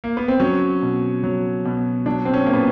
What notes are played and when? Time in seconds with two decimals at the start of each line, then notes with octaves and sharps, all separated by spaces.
0.04 A#3
0.17 B3
0.28 C4
0.40 F#3 C#4
0.82 B2
1.23 F#3
1.65 B2
2.06 F#3 D4
2.25 C4
2.34 C#4
2.46 A#2 A#3
2.53 B3